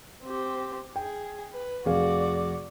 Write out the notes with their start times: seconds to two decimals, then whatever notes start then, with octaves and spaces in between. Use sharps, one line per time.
0.23 C4 G4
0.96 G#4 G5
1.52 B4
1.85 F1 F#4 G#4 D5 F5